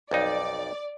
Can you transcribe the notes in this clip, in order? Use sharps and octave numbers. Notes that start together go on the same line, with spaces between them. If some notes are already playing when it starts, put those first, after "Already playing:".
B1 F2 D#4 D5